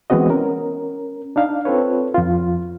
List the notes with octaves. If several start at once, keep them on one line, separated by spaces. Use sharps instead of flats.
E3 G#3 B3 C4 F#4 D#5
C#4 A#4
D4 D#4 F5
C4 F4 A4 B4 C#5
F2 F4